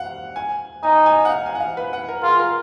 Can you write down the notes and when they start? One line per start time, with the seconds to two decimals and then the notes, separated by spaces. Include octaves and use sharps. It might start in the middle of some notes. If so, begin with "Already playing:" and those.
Already playing: F5 F#5
0.36 G#5
0.83 D#4 G#5
1.06 G#5
1.25 F#5
1.29 F5
1.46 G#5
1.55 F#5
1.60 F5
1.77 B4
1.93 F#5
2.09 A#4
2.23 F4 G#4
2.39 A#4